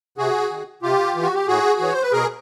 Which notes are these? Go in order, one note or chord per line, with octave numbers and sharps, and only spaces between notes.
C3 F#4 G#4
D#3
C3 F4 G4
E3
F#4
G4
A2 F#4 G#4
E3 C#5
C5
B4
B2 G#4 A#4